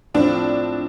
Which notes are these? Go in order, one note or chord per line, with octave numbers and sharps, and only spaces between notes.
A2 F3 C4 D4 F4